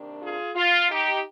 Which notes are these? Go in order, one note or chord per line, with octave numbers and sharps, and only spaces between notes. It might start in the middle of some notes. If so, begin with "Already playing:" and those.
Already playing: C3 D#3 A#3 D4
F4 G#4
F4
D#4 G4